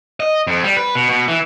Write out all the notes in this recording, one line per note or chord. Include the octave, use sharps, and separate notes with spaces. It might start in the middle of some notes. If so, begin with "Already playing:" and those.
D#5
F2
G3
B4
B2
B2
E3